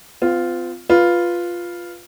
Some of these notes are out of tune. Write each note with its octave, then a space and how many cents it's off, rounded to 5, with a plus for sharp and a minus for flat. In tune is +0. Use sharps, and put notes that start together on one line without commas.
C4 -45 F4 +0
F4 +0 B4 +0